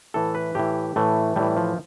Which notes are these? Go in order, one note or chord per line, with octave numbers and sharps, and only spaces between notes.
A2 E3 A4
B4
A2 E3 G4
A2 E3 A3
A2 E3 G3
F3